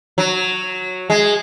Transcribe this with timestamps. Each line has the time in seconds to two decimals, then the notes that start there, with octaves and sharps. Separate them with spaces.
0.18 F#3
1.10 G#3